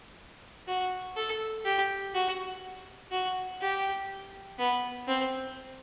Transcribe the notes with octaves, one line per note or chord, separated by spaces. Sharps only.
F#4
A4
G4
F#4
F#4
G4
B3
C4